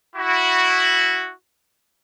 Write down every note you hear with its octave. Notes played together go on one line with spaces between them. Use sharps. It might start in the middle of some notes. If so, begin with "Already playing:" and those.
E4 F#4